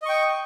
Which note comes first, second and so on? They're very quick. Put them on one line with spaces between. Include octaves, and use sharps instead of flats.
D#5 C#6 G5